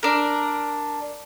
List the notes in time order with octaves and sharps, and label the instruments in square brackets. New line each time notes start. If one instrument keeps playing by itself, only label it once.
[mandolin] D4 A#4